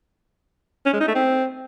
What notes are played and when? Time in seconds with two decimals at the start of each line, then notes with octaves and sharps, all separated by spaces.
0.86 C#4
0.93 G#3
1.00 D#4
1.08 A3
1.15 C4